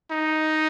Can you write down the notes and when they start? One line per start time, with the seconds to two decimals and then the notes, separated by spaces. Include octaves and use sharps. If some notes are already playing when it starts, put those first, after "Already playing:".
0.11 D#4